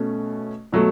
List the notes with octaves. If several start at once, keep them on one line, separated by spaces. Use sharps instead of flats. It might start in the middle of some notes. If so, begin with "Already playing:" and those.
Already playing: B2 A3 C#4
B2 F#3 A3